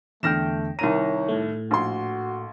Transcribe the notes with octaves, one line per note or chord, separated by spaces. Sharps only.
E2 D3 A3 G5 F6 A#6 E7
C2 D#3 C#5 A#5 D#7
A2 A3
A#1 F#4 C6